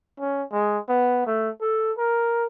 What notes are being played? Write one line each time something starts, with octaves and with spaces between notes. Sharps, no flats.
C#4
G#3
B3
A3
A4
A#4